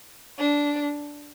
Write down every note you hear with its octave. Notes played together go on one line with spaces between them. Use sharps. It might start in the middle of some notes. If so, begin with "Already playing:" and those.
D4